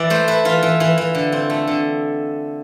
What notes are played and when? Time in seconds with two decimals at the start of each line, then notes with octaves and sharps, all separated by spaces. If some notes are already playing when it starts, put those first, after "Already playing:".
Already playing: E3 E4 D5
0.10 A3 C5
0.28 E4 B4
0.45 E3 F4
0.63 E3
0.80 E3
0.98 E3
1.15 D3
1.32 C4
1.50 A3
1.67 D3